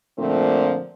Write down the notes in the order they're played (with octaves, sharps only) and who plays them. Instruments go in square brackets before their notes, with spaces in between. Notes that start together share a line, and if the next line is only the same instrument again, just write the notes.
[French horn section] A#2 D3 F3 A3 C4